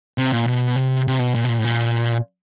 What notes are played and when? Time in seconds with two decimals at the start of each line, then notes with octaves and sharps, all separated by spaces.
0.18 C3
0.32 A#2
0.48 B2
0.76 C3
1.08 C3
1.19 B2
1.34 A#2
1.44 B2
1.49 A#2
1.58 A2
1.64 A#2